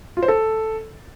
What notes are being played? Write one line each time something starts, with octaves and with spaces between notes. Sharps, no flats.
F4
C5
A4